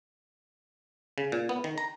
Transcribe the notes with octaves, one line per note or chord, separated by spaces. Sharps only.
C#3
A#2
B3
D#3
A#5